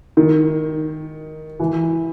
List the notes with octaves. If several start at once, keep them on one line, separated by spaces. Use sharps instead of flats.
D#3
E3